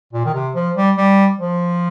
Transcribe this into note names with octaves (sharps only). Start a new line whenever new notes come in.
A#2
D#3
C3
F3
G3
G3
F3